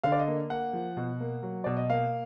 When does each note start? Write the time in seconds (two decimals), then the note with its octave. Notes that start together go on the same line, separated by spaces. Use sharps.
0.03 D3 F5
0.12 D5
0.19 D#5
0.28 A#3
0.50 A#3 F#5
0.73 F3
0.97 B2
1.20 A#3
1.43 F#3
1.64 B2 D5
1.77 D#5
1.89 A#3 F5